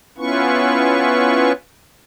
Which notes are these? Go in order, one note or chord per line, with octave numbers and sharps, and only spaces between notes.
B3 C#4 E4 F4 B4 C#6